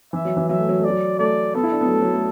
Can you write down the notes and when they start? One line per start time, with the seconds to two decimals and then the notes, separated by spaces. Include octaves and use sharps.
0.13 E3 E5
0.25 F#3
0.37 E3
0.49 F#3 E5
0.59 A3
0.69 F#3
0.79 A3
0.84 F#3 D5
1.19 A3 D5
1.54 B3 A4
1.63 E4
1.72 D4
1.81 B3
1.86 F#3
1.90 A3
2.02 F#3
2.14 A3